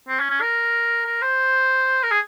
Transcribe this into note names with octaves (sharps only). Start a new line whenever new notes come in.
C4
C#4
C#4
A#4
A#4
C5
A#4
G#4